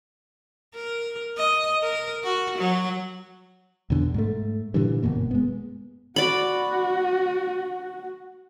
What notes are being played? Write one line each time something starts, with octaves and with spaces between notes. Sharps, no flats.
A#4
D#5
A#4
F#4
F#3
E2 B2 D3
G#2 A3
G2 A#2 D3 E3
G1 F#2 B2 A#3
G#3 B3
F#4 D5 B5